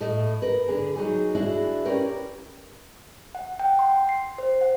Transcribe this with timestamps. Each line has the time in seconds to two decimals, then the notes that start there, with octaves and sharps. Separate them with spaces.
0.01 A2 A4 D#5
0.42 A#4 B4
0.68 D3 G#4
0.96 F#3 D#4 G#4
1.35 D4 E4 F#4 G#4
1.85 C#4 G4 A#4 B4 C#5 D5
3.35 F#5
3.59 G5
3.79 C6
4.09 C7
4.38 C5
4.61 F#5